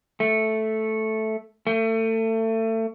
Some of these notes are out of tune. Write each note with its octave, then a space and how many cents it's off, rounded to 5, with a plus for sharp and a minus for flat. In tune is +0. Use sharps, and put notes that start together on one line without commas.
A3 -5
A3 +30